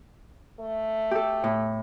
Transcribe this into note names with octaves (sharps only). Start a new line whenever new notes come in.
A3
G4 A4
A2